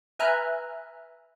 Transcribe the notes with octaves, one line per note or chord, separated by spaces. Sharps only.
B4 E5 G#5 A#5 F6 F#6